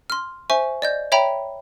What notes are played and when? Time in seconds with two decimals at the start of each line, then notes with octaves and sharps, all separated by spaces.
0.10 C6 F6
0.50 C5 E5 G#5 C#6
0.82 D5 D#5 G6
1.12 C#5 E5 G5 A#5 B5